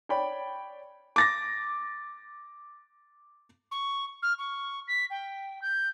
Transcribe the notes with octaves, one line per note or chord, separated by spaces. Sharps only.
C#5 D5 G5 B5
D6 A6 A#6
C#6
F6
C#6
B6
G5
G6